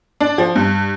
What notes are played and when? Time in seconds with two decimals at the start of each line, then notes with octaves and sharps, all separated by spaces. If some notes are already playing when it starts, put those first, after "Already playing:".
0.21 D4
0.38 F3
0.55 G2